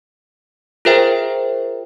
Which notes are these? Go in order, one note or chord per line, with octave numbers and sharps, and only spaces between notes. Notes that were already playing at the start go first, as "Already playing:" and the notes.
F4 G#4 A#4 C5 E5 G5